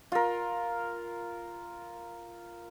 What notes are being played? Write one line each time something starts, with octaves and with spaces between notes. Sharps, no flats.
F4 A#4